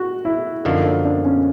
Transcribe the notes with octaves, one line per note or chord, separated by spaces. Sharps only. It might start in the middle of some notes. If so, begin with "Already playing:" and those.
Already playing: F#4
E4
F#2 D3 F3 A#3 D#4
D4
D4
C#4